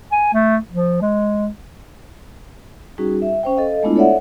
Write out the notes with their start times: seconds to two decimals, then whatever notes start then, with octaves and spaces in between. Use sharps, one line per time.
0.12 G#5
0.33 A3
0.71 F3
1.01 G#3
2.98 G3 C#4 D#4 F#4 G#4
3.22 E5
3.43 C#4 C5 G5
3.57 A4 D#5 F5
3.83 G#3 A3 B3 D4 E4 F4
3.96 A4 C#5 D5 E5 F#5